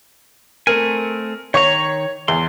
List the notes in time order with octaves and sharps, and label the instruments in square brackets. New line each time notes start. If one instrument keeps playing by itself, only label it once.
[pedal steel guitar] A3 C4 G#5 [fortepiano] A#4
[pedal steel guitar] D#3 A#5 [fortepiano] C#5 C#6
[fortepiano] E2 [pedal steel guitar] C6